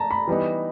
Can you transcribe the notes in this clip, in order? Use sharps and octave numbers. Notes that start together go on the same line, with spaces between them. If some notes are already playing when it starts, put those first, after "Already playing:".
Already playing: A5 A#5
B5
E3 G3 B3 D#4